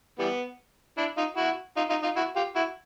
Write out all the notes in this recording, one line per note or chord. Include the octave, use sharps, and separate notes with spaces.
E3 G3 B3
D4 E4
D#4 F4
E4 F#4
D#4 F4
D#4 F4
D#4 F4
E4 F#4
F4 G4
E4 F#4